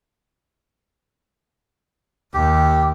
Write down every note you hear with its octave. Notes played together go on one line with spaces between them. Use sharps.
D#2 G4